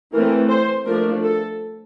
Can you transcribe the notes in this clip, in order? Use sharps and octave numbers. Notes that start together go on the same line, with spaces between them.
E3 A3 C4 A#4
C5
F3 A3 D4 A#4
A4